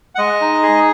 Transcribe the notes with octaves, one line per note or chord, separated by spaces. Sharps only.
F#5
G#3 D#5
D#4
G#4